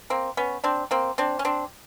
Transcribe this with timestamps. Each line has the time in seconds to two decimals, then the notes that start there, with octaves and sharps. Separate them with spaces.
0.10 A#3 C4
0.37 B3 C#4
0.64 C4 D4
0.91 A#3 C4
1.18 C4 D4
1.39 C#4
1.45 C4 D4